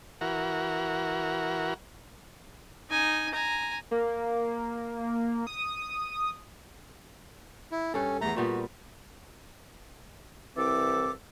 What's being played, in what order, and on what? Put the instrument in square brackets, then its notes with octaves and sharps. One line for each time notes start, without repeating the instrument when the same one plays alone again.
[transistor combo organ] E3 F#4 A#4
[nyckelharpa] D#4 G#5
G#5 A#5
[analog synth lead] A#3
D#6
[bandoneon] E4
[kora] G2 A4 [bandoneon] C#4
[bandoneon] E2 A#5 [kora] A3
[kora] A#2 G3 B3 [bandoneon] F#4
[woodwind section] C2 E3 C4 A4 D6